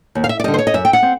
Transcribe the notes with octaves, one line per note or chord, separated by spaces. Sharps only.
D#2
F5
E5
D5
D3 G3 D#5
C5
C#5
D#5
F#2 E5
G5
F#5
C4